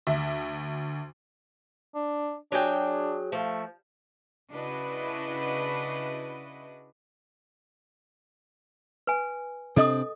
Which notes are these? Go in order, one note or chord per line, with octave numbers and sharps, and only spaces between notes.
D2 E5
D4
F#3 D4 G#4 G5
F3 A3
C#3 D4 E4 F#4 B4 D#5
B4 G#5
C3 C4 D4 A4 D#5 D#6